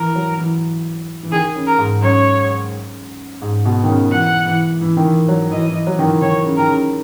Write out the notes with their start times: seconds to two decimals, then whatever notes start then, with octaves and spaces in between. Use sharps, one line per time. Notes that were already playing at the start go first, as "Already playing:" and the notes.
Already playing: E3 A#4
0.15 F#3
0.38 E3
1.23 E3
1.32 D#3 G#4
1.55 C#3
1.67 A#4
1.78 G#2
2.02 F#2 C#5
3.42 G#2
3.65 B2
3.83 D#3
3.88 C#3
4.12 E3 F#5
4.46 E3
4.81 E3
4.97 D#3
5.05 E3
5.28 F#3
5.51 E3 D#5
5.69 E3
5.87 F#3
5.99 D#3
6.04 E3
6.21 D#3 C#5
6.45 C#3
6.57 D#3 A#4
6.68 C#3